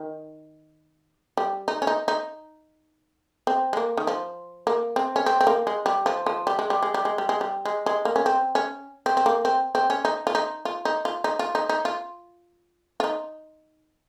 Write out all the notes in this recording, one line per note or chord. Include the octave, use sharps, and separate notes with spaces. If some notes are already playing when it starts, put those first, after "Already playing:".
Already playing: D#3
G3
D#4
C#4
D#4
D#4
C4
G#3
A#3
D#3
F3
A#3
C4
C#4
C4
C4
A#3
G#3
G3
F3
F3
G3
G#3
G3
G#3
G3
G#3
G3
G#3
G3
G#3
G#3
A#3
C#4
C4
C#4
C4
C4
A#3
C4
C4
C#4
D#4
F4
D#4
F4
D#4
F4
D#4
F4
D#4
D#4
F4
F4
D#4